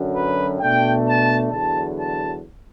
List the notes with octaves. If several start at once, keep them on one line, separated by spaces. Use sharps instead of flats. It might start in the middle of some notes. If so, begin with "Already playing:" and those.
Already playing: F#2 D3 F#3
B4
B2 A3 D4 G5
A5
E2 D3 F#3 A5
A5